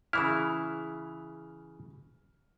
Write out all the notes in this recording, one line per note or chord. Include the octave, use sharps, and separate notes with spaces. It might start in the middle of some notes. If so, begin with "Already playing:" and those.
C#3 E3 E4 F6